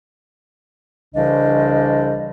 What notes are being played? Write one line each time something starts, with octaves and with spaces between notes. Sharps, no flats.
C2 C#3 E3 D4 C5 D#5